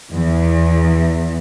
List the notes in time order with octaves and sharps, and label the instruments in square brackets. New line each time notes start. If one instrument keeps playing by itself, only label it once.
[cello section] E2